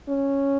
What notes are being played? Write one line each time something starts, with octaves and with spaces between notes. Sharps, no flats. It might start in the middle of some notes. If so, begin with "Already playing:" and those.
C#4